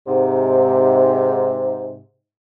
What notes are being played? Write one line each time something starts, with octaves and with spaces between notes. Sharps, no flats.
G#2 C3